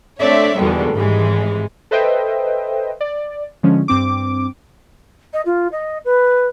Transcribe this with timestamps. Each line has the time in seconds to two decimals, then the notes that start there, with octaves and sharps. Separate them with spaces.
0.19 A3 C4 D4 C#5 D5 E5
0.57 E2 B2 D3 D#3 G3 G#3
0.94 G#1 G#2 E3 G3 G#3
1.91 A4 B4 C5 D#5 E5 G5
3.01 D5
3.63 D3 F3 G#3 C#4
3.88 G2 C4 D6
5.33 D#5
5.45 F4
5.71 D#5
6.05 B4